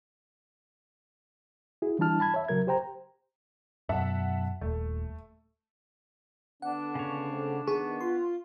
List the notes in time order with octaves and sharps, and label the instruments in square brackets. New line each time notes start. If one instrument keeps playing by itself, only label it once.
[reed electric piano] E4 F#4 G#4
E3 G3 D4 E4 A5 F6
A5 B5 G#6
C#5 E5
C#3 F#3 A#4 G#6
G4 C5 G5 A#5
[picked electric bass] F#2 B2 [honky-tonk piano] E5 F#5 A5
[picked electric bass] D#1 [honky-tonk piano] A3
[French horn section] D3 B3 [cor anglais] D4 [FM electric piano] F#5
[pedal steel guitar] C#3 C#5
[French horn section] A3 C4
[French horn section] D#3 [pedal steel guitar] B3 C#6 [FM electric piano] G#4
[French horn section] F4 [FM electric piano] C6